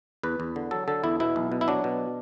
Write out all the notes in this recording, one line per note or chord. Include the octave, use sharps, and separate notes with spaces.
E2 B4
E2
D3
F#3 A4
D3 A4
E2 E4
B2 E4
B1
B2
E4
F#3 D4
B2